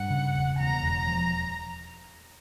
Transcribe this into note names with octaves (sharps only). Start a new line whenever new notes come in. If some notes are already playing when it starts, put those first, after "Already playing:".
Already playing: G2 F#5
C#3
E1
E2 A#5
E1
F3